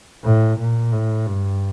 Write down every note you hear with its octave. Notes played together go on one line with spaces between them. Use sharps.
A2
A#2
A2
G2